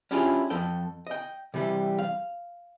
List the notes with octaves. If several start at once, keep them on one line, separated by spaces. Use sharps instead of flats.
C#4 D4 E4 F4 G4 G#4
F2 A4 G5
D#5 G5
C3 E3 G3
F5